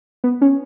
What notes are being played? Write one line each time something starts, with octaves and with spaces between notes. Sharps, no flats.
B3
C#4